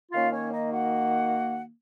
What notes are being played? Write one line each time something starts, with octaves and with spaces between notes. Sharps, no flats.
D#3 A#3 C#4 F4 F5
C#4 C#5
D#4 D#5
F#4 F#5